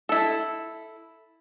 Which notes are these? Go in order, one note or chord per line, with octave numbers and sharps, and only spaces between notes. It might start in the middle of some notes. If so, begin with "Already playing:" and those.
E4 A4